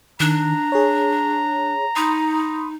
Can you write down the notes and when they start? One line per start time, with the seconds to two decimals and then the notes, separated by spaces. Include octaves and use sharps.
0.20 D#3 D4 A#5
0.72 G#4 C#5
1.96 D#4 B5 C6 D#6